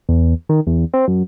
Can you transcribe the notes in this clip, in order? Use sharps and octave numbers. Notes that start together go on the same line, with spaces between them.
E2
D#3
E2
C4
F#2